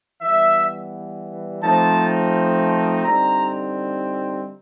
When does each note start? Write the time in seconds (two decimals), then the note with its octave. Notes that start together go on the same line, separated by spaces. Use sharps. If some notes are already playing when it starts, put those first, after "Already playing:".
0.21 E3 G3 B3 E5
1.62 F3 A3 C4 D#4 A5
3.03 D3 G3 C4 D#4 A#5